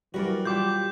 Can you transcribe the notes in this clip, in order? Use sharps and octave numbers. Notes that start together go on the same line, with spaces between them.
F#2 E3 G3 F#4 A#4 D5
G3 F4 G5 D6 G6